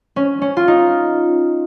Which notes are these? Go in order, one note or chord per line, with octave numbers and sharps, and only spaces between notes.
C#4
C#4
F4
D#4